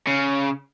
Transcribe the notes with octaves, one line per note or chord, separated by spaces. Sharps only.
C#3